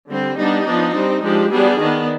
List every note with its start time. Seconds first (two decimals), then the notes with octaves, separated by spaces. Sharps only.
0.09 D3 G3 C4
0.38 G3 B3 D4 D#4
0.66 F3 B3 D4
0.94 G3 C4
1.23 F3 G#3 D4 G4
1.51 G3 B3 D4 G#4
1.80 D#3 B3 D4